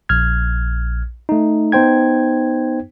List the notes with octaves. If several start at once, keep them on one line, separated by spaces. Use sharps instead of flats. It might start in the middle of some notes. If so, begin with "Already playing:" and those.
A#1 F6 G#6
A3 D#4
B3 D#4 C5 G5 G#6